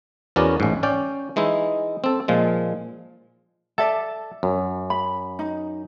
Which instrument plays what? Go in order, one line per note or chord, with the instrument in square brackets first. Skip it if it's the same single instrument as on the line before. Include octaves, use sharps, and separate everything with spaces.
[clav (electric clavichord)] E2 B3 C#4 F#4 A#4 D5
A1 G#2
C#4 D5 G5
E3 G#3 D#4 E4
C4 A4
A#2 F3 G#3
[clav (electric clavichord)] A4 [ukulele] D5 E5 A5
[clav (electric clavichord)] F#2
[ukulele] B5
D#4